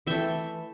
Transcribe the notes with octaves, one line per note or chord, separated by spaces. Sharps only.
E3 A3 E5 G5